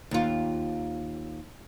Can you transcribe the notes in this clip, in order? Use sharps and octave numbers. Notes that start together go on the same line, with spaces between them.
D#2 F4